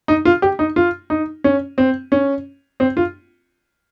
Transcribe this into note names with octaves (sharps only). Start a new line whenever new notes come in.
D#4
F4
G4
D#4
F4
D#4
C#4
C4
C#4
C4
F4